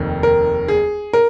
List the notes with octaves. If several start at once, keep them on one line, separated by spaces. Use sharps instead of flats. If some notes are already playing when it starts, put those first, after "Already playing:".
Already playing: F1 D#2 D#3
A#4
G#4
A#4